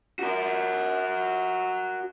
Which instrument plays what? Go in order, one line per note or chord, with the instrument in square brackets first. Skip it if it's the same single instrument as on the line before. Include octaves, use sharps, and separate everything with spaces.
[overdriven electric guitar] F#4 A#4